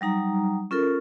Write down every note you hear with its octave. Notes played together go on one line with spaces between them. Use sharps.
F#3 G3 D#4 A#5
C#4 F4 A4 A#4